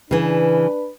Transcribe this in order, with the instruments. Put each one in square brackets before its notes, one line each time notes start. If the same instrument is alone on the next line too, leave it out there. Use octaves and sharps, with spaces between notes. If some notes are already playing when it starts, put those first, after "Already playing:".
[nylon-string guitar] C#3 E3 [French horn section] D4 B4